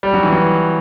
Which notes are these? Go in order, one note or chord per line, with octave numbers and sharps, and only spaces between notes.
G3
F#3
E3
F#3